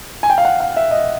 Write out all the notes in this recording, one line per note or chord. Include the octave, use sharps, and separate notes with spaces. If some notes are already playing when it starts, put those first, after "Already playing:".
G#5
G5
F5
F#5
F5
E5
D#5